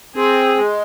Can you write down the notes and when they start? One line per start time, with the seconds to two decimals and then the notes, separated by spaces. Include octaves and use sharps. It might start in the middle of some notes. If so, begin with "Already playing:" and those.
0.16 C4 G#4
0.55 G#3